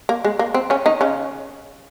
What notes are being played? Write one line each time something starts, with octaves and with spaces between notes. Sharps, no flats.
A#3
G#3
A#3
C4
C#3 C#4
D#3 D#4
C#3 C#4